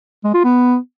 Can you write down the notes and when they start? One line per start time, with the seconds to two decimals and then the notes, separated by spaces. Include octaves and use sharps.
0.24 G#3
0.34 F4
0.44 B3